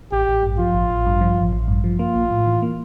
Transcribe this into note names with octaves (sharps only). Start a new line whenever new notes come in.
A1 G4
A1
G2
F3 F4
A1
A1
G2
F3
A1
A1
G2
F3
A#3 F4
A#1
A2
E3
A#3